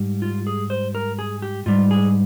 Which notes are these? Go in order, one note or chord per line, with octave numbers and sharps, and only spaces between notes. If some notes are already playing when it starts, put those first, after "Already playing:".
Already playing: G#2 G3
F4
G#4
C5
A#4
G#4
G4
G#2 G3 F4
G#4